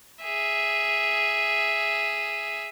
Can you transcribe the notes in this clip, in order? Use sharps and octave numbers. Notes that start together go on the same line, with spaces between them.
G#4 E5